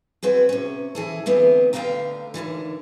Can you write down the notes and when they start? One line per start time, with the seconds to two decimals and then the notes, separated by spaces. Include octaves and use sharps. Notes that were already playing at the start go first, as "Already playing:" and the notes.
0.23 B3 C4 F#4 G#4
0.49 C3 C#4
0.95 E3 G#4 A4
1.26 D2 E3 B3 C4
1.73 D2 D3 B4 F5 G5 A#5
2.34 D#2 A2 D3 E3